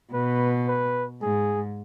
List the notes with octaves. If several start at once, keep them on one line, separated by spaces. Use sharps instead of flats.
B2 B4
B4
G#2 G#4